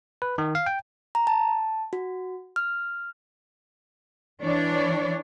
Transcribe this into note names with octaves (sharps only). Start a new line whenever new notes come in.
B4
D#3
F5
G5
A#5
A5
F#4
F6
E3 D4 C#5 D5